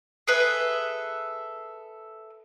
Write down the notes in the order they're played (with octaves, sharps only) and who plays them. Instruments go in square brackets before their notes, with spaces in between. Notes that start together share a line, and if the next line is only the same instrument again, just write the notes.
[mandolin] G#4 A4 B4 E5